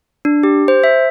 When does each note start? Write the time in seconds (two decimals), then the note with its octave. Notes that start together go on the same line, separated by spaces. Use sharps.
0.25 D4
0.43 G4
0.68 C5
0.84 E5